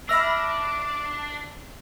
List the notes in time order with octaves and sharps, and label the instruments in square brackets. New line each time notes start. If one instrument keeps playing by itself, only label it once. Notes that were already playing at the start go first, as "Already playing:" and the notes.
[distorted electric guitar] D4 [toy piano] E5 E6 [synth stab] B5 F6 A#6 [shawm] D6